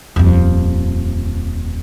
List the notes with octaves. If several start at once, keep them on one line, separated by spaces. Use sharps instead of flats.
D#1 F2